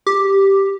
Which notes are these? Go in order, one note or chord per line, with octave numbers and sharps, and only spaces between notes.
G4